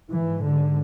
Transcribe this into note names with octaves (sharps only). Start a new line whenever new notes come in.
G#2 E3
D3